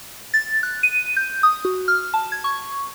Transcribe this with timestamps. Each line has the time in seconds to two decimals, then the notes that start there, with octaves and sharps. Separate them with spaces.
0.34 A6
0.63 F#6
0.83 D#7
1.17 G6
1.43 D#6
1.65 F#4
1.88 F6
2.14 A5
2.32 G#6
2.44 C#6